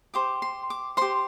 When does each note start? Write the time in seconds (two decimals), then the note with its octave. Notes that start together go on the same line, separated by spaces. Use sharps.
0.14 G4 C5 D6
0.42 C6
0.70 D6
0.97 G4 C5 C6